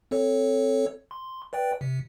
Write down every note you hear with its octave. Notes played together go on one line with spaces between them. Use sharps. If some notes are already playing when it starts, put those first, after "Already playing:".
C4 A4 C#5
C6
B4 D5 G5
C3